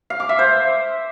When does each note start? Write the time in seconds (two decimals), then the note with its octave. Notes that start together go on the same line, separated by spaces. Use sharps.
0.10 F5
0.20 D6
0.29 E5
0.39 C5